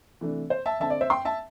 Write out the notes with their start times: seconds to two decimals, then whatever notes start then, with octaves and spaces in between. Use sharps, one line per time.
0.21 C3 E3 A3 D4
0.50 C5
0.66 E5 A5
0.80 D3 C4 E5 A5
0.90 D5
1.01 C5 E5
1.10 G5 C6
1.25 E5 A5